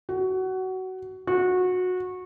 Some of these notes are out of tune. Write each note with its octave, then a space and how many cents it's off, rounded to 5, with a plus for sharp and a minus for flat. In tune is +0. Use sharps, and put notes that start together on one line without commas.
F#4 +20
F#4 -20